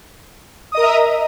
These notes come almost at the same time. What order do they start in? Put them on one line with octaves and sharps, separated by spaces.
D#6 D#5 A#4 A#5 E5